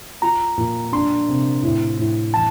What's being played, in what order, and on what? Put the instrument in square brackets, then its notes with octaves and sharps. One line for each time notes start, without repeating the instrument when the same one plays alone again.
[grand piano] F4 [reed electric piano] A#5
[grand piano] A#2
[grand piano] D4 [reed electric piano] C6
[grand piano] C3
A2
A2
[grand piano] E3 [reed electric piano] A5